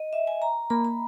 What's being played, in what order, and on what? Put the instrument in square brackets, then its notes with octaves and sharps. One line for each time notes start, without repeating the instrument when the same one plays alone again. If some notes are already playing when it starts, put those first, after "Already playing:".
Already playing: [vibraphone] D#5
E5
G#5
A#5
[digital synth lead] A#3 [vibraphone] B5
[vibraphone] B5